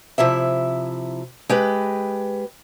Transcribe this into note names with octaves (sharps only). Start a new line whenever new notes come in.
C3 F3 E4 E5
G#3 G4 B4